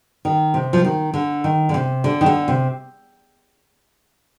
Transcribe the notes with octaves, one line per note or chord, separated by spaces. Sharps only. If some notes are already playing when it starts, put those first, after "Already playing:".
D#3
C3
F3
D#3
D3
D#3
D3
C3
D3
D#3
D3
C3